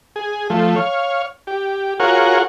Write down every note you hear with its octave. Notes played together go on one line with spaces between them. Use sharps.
G#4
F3 A3
C#5 F5
G4
F4 F#4 G#4 A#4 C#5 F#5